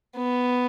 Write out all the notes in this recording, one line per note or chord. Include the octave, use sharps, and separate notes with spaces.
B3